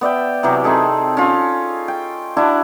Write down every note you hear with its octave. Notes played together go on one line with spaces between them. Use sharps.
B3 D5 E5 G5
C3 E3 F#3 G4
C4 D#4 G#4 A4
C#4 F4
G5
D4 E4 F#4